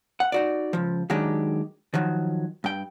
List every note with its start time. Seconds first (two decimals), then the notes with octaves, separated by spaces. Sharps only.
0.20 F#5
0.32 D#4 F#4 D5
0.73 C#2 F3
1.10 D#3 F#3 G#3 D4 D#4 G4
1.94 D#3 F3 F#3
2.64 G2 G5